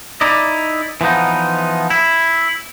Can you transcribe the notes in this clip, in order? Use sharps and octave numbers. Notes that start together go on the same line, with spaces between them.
D#4 E4 D5 D#5
E3 F3 B3 D#4
E4